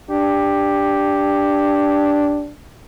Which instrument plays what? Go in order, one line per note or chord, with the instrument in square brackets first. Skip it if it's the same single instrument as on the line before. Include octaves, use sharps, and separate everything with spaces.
[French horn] D4 [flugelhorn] G4